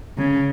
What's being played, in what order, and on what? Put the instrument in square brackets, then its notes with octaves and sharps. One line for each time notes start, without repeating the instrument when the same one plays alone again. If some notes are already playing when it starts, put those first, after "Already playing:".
[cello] C#3